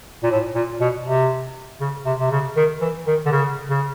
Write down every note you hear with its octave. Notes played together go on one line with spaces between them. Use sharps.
A#2
A2
A#2
B2
C3
C#3
C3
C3
C#3
D#3
E3
D#3
D3
C#3
C#3